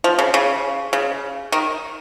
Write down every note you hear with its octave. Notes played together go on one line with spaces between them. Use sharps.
F3
C#3
C#3
C#3
D#3